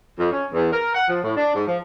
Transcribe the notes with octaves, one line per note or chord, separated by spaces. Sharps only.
F2
C#4
E2
A#4
F#5
F3
A2
D4
G#2
F3